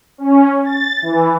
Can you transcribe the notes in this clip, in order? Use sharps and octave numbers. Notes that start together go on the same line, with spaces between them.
C#4
A6
E3